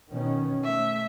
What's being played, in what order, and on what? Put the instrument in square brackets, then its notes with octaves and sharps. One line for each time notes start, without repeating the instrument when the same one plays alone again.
[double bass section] B2 D#3 C#4
[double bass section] A3 [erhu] E5